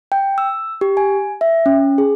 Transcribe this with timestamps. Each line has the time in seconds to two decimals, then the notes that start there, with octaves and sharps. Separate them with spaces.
0.12 G5
0.38 E6
0.81 G4
0.97 G#5
1.41 E5
1.66 C#4
1.98 G#4